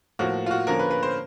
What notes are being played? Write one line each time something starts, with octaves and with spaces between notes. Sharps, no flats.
A2 F3 A#3 F#4
F4
F#4
D3 F3 A#3 C#4 A#4
B4
B4
C5